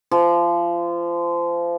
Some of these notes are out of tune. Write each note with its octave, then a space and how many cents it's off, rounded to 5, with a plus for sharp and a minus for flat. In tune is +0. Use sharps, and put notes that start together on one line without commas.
F3 -25